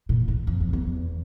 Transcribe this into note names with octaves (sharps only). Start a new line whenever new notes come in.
A#2
A2
F2
F2
E2